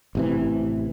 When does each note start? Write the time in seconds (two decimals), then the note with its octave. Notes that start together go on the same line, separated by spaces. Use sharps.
0.15 A1 C3 E3